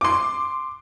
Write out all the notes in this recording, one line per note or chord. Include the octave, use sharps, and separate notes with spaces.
C6 D6